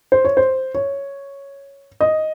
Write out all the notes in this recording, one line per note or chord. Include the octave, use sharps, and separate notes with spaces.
C5
C#5
C5
C#5
D#5